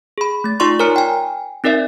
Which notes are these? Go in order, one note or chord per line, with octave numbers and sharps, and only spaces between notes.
G#4 B5
A3 A6
D#4 F4 D5 C6 C#6
A#4 C#5 G#5 A#5 F6 C#7
G5 G#5
C4 D#4 A#4 D5 E5